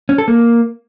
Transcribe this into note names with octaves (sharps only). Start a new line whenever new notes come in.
C#4
A4
A#3